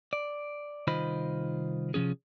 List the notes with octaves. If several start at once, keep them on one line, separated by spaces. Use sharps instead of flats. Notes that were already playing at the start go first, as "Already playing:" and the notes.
D5
C2 D#3 F4 C5 D#5 B5
C3 F3 C#4 G#4